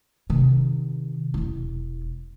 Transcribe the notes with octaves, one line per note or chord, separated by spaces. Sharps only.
C3 D#3
E1 E4